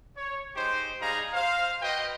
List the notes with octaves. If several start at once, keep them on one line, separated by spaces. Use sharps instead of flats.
C#5
G#3 D#4 G4 C5
G3 D#4 G#4 F5 A#5
C5 F5
F#4 B4 C5 D#5 G5